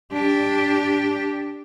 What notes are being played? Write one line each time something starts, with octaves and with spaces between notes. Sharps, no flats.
D4 G4